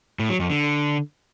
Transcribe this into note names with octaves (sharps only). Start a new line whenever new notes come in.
A2
F#3
F2
D3